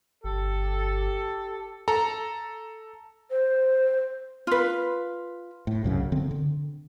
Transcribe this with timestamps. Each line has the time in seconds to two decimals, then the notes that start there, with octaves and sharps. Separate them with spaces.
0.24 G1 G4 A4
1.88 A4 A#5
3.30 C5
4.47 F4 B4
5.67 A2
5.84 C2 F#2 C#3
6.12 D3 C4
6.31 D3